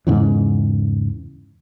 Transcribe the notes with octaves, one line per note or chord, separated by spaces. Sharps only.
E2 G#2 C#3 E3